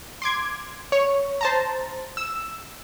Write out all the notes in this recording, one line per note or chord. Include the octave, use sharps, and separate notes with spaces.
C6 D6 G#6
C#5
C5 A5 A#5
E6